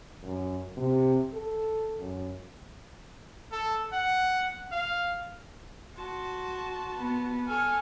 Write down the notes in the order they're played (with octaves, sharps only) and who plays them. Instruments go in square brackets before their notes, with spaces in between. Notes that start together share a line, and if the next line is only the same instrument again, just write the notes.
[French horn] F#2
C3
A4
F#2
[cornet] A4
F#5
F5
[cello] F#4 [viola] A5 [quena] C6
[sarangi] B3
[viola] A4 C#5 [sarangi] G#5 [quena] F6